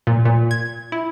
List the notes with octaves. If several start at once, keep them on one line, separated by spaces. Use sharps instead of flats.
A#2
A#2
G#6
E4